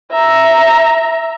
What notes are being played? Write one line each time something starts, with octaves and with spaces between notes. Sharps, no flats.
E5 A#5